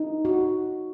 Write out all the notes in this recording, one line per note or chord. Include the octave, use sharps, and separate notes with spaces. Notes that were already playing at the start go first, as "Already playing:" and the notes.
Already playing: D#4
F#4